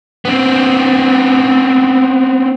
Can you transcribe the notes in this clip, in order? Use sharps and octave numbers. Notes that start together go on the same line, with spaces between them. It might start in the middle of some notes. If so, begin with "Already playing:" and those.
B3 C4